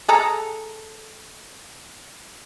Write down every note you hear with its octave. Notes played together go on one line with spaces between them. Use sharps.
G#4 A4 A#5